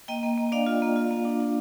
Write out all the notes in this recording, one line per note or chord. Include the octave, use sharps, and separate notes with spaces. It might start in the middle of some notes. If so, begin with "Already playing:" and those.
A#3 D#5 G5
A#3
A#3
D4 D5 F5
F4
A#3
F4
A#3
D4
D4